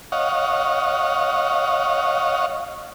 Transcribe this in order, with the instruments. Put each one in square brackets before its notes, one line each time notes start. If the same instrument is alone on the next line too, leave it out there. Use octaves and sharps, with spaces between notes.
[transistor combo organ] C#5 D#5 F5 F#5